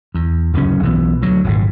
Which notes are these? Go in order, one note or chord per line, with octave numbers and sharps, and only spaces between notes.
E2
D1 F#2 C#3 C#4
B1 E3 B3
D2 F#3
D#1 G#1 G#2